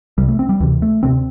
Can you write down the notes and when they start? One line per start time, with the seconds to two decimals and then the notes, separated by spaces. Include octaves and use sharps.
0.18 C2 C3 G3
0.28 A3
0.39 C4
0.49 G3
0.60 D2 C3 E3
0.82 A3
1.03 D2 C3 C4